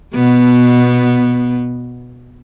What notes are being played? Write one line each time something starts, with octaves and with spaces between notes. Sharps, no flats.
B2 B3